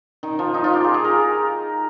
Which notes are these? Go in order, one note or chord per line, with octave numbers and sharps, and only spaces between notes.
D#3
F3
D#4
F4
G4
G#4
G#4
A#4